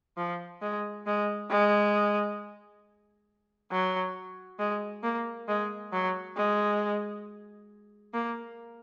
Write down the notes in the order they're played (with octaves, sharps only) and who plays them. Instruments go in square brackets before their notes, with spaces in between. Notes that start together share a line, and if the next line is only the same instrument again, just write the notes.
[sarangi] F3
G#3
G#3
G#3
F#3
G#3
A#3
G#3
F#3
G#3
A#3